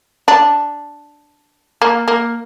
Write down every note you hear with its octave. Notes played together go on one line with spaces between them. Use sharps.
D4
A#3
A#3